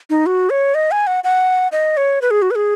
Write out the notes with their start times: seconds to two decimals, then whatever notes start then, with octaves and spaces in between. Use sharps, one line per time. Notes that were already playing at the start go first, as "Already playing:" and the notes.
0.10 D#4
0.26 F#4
0.50 C#5
0.75 D#5
0.91 G#5
1.07 F#5
1.24 F#5
1.72 D#5
1.97 C#5
2.22 B4
2.31 G#4
2.42 F#4
2.51 B4
2.55 G#4